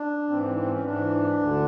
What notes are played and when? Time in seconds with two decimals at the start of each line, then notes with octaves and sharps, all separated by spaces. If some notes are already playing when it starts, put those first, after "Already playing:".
Already playing: D4
0.29 G#2 E3 C4
0.43 C4
0.57 C4
0.70 C#4
0.84 G#2 E3 D4
1.38 D2 D3